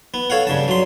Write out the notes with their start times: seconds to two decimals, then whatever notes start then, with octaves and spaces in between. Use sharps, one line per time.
0.14 B3
0.30 A4 C#5 F5 F#5
0.47 G2 C#3 A5
0.68 F#3 C6